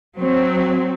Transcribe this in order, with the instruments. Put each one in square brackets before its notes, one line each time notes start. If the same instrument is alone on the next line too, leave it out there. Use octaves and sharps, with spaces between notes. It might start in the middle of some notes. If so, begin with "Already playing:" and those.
[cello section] F#3 [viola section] C4